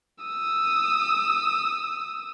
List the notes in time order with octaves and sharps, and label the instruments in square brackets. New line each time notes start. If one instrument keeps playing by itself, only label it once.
[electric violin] D#6 E6